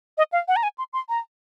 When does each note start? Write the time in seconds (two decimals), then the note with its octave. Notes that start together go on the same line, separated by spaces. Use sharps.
0.18 D#5
0.33 F5
0.48 F#5
0.56 A#5
0.63 G#5
0.78 C6
0.93 C6
1.09 A#5